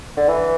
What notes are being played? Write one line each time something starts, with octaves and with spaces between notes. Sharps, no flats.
D3
E3